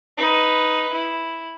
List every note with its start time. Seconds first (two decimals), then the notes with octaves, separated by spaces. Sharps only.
0.18 D#4 B4
0.93 E4